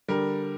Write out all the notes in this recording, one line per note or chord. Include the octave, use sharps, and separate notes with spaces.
D3 G3 A#4